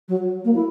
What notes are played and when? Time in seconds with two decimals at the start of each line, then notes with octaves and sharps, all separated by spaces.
0.08 F#3
0.44 A#3
0.54 E4